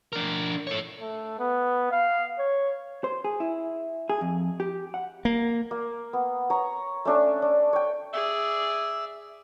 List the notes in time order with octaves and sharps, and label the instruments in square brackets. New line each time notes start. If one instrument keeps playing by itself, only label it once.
[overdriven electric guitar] D4 A#4
A4 C#5
[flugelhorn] A3
B3
F5
C#5
[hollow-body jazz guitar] C5
G#4
E4
G#4
F2
G4
F#5
[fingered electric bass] A#3
[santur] A#3
B3
C#5 A#5
A3 C#4 D4 A4
D4
C#5 G5
[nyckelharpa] G#4 D5 [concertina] E5